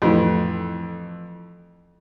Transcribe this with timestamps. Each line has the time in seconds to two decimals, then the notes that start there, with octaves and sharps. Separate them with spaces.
0.02 F2 A2 E3